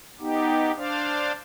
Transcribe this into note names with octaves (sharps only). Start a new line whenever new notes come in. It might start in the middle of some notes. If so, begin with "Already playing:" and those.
B3 D#4 G4
D4 C5 D5 F5